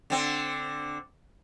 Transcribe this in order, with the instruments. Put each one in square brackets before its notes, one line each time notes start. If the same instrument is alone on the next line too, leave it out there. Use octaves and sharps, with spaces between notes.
[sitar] D3 C4